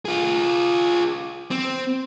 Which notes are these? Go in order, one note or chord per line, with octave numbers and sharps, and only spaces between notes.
F4 G#4
C4